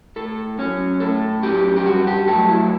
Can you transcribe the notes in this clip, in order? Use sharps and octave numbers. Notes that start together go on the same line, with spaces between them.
A2 A4
F#3 C#4 C#5
A2 A4
F#3 C#4 G4
G4
G2 F#4
G4
F#3 A3 A4
E4